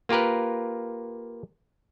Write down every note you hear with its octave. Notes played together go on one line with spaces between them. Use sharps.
A#3 F4 G4 A#4 B4